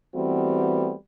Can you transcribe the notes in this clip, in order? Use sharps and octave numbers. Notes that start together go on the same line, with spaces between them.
E3 G3 A3 B3 C4 F#4